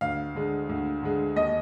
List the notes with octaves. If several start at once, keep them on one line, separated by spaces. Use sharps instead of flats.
D2 F5
D3 G#3
D2
D3 G#3
D#2 D#5